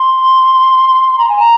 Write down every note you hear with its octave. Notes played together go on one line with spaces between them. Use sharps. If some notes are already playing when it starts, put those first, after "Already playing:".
Already playing: C6
A#5
G#5
A#5